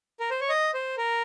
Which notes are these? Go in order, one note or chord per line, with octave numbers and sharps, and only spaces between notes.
A#4
C5
C#5
D#5
C5
A#4